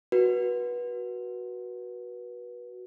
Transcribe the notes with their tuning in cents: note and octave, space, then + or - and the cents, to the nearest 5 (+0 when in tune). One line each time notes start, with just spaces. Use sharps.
F#4 +0 B4 -25